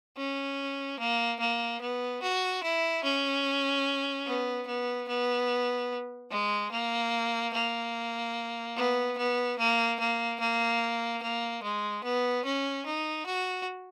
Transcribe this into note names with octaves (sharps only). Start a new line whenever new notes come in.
C#4
A#3
A#3
B3
F#4
E4
C#4
B3
B3
B3
G#3
A#3
A#3
B3
B3
A#3
A#3
A#3
A#3
G#3
B3
C#4
D#4
F#4